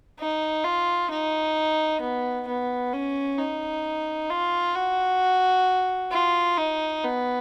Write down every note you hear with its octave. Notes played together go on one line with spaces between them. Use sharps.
D#4
F4
D#4
B3
B3
C#4
D#4
F4
F#4
F4
D#4
B3